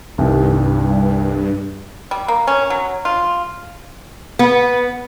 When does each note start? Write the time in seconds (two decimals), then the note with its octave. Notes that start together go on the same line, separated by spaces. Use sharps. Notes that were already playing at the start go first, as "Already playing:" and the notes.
0.18 C2 G2 D#3
2.11 G3
2.28 A#3
2.47 C#4
2.70 F#3
3.05 F4
4.39 B3